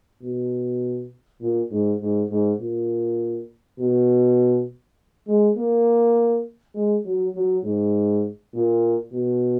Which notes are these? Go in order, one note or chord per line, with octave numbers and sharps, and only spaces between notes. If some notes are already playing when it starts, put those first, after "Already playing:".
B2
A#2
G#2
G#2
G#2
A#2
B2
G#3
A#3
G#3
F#3
F#3
G#2
A#2
B2